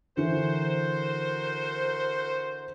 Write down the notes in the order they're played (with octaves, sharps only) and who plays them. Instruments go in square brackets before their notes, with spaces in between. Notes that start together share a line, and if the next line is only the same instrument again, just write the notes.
[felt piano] D3 E3 [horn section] F#4 A#4 C5